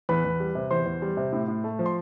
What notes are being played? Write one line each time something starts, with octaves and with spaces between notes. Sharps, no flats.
E2 B4 B5
E2
G3
C3
E2 C5 C6
E2
G3
C3
A2
A2
A3
F3
C6